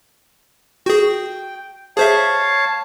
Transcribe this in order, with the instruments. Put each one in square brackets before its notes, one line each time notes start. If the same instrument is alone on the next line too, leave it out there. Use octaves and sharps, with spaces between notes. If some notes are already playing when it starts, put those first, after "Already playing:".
[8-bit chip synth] F#4 G#4 [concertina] G5
[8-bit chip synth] G#4 C5 E5 [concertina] C#5 F5 A5